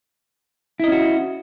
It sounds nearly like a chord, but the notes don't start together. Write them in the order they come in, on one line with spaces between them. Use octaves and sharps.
E4 D#5 C#4 F#4